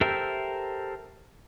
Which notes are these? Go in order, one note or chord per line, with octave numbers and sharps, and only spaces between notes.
G4 A4 A#4 C5 E5